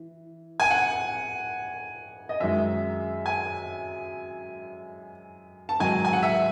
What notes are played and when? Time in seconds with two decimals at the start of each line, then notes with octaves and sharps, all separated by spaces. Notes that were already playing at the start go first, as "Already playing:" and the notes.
Already playing: E3
0.60 G#5
0.71 F#5
2.29 D#5
2.40 F#2 D#3 G#3 E5
3.26 G#5
5.69 A5
5.80 G#2 D#3 F#3 G#5
6.05 G#5
6.13 F#5
6.23 E5